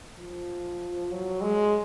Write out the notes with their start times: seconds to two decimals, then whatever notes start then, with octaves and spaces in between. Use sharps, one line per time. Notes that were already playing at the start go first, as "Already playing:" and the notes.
0.18 F3
1.11 F#3
1.41 G#3